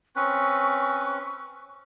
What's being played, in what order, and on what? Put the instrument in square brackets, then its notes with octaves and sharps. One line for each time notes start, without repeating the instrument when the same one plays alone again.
[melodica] C4 C#4 B4 [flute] C#6